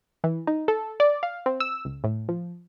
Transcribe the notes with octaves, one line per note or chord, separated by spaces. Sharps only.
E3
D#4
A4
D5
F5
C4
E6
C#2
A2
F3